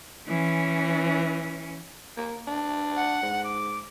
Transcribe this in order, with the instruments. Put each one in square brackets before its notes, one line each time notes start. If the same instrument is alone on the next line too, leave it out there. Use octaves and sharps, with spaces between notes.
[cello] E3 C#4
[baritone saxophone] A#3
D4
[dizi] F#5
[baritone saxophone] G#2
[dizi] D6